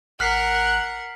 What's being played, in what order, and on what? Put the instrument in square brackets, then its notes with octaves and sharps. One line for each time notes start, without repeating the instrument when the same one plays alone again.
[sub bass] A1 [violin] A#4 F#5 [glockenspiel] F6 B6 C7 [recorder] F#6